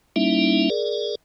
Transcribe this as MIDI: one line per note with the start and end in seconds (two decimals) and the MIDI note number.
0.16 0.70 55
0.16 0.70 58
0.16 0.70 61
0.16 0.70 63
0.16 0.70 64
0.16 0.70 76
0.70 1.15 68
0.70 1.15 70
0.70 1.15 74